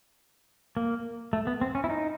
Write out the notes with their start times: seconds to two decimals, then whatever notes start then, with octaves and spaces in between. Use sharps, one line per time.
0.77 A#3
1.33 A3
1.47 B3
1.61 C4
1.75 C#4
1.84 E4
1.90 D#4